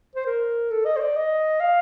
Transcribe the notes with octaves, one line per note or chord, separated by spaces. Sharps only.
C5
A#4
A4
D#5
C5
D5
D#5
F5